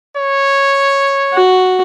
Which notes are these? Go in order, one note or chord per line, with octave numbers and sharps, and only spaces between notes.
C#5
F#4